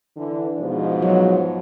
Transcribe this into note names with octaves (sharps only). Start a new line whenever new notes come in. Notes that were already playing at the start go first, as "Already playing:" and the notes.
D3 E3
G#2 B2 F3
F#3